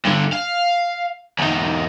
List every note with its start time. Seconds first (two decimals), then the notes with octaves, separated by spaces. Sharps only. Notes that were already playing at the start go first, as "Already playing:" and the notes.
0.05 G2 D3
0.33 F5
1.39 E2 D#4